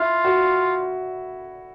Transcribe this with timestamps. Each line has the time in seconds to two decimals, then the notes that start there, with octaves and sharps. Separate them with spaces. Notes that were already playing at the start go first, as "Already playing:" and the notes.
Already playing: E4 F4
0.24 F#4